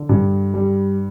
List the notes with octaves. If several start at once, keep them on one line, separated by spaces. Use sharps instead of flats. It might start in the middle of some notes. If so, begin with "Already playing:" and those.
Already playing: D3
G2
G3